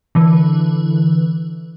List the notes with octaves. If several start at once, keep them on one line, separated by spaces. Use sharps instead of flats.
D3 E3